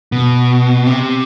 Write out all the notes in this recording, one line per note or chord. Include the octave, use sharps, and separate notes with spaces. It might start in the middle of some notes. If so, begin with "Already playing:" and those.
B2
C3